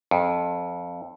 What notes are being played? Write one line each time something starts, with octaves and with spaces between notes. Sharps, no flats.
F2